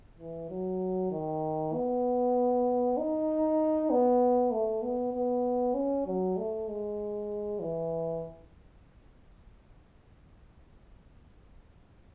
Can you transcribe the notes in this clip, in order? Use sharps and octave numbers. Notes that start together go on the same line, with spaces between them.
E3
F#3
D#3
B3
D#4
B3
A3
B3
B3
C#4
F#3
A3
G#3
E3